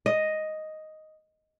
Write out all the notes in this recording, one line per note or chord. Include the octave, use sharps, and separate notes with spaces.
D#5